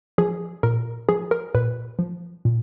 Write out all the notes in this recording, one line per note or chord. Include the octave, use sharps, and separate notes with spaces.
F3 G#4
A#2 A#4
F3 G#4
A#4
A#2 B4
F3
A#2